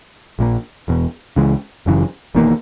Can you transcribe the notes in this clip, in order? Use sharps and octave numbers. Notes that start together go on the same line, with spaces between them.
A#1 A#2 A#3
E1 E2 B2
C#2 C#3 E3 G#3
F#1 F#2 C#3 E3
E1 E2 D#3 A#3